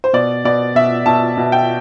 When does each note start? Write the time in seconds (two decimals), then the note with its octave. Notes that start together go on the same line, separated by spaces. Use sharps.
0.04 C5
0.13 B2 D5
0.45 B2 D5
0.75 B2 E5
1.06 B2 A5
1.37 B2
1.52 G5